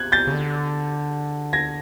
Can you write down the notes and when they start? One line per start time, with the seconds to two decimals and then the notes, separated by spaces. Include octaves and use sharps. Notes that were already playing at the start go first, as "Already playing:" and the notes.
Already playing: F#6 G#6
0.12 G6 A6
0.27 C#3
0.32 D3
1.53 G#6 A#6